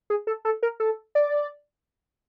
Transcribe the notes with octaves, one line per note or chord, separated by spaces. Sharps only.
G#4
A4
A4
A#4
A4
D5